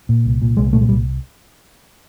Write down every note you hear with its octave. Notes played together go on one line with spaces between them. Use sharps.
A#2
C2
A#2
C2 G#3
A#2 A3
G#3
C2 G3